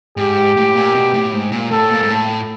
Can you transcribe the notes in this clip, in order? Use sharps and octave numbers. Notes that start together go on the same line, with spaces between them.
G#2 G4
A2
A#2
B2
A2
G#2
A#2
A2 A4
A#2
G#2
A2